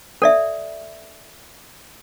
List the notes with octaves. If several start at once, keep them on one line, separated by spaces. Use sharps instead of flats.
A4 D5 E5